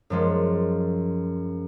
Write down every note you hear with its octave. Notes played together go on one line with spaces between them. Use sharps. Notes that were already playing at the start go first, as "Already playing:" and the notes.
F#2 F3 G#3